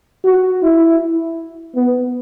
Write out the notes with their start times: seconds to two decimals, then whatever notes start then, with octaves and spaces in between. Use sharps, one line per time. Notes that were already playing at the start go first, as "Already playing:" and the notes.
0.25 F#4
0.63 E4
1.76 B3